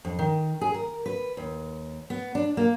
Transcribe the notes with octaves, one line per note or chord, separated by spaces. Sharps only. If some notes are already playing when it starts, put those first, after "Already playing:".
F2
D#3
G#4
A#4
B4
D#2
B3
D4
A#3